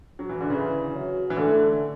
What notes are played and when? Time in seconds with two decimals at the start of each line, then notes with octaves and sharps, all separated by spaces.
0.19 F#3
0.29 E3
0.40 D3
0.50 C#3 E3
0.93 F#3
1.30 E3
1.37 D3 A3